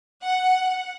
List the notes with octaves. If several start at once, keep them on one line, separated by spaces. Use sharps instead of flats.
F#5